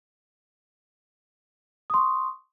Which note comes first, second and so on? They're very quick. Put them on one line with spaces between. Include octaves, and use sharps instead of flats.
D#6 C6 C#6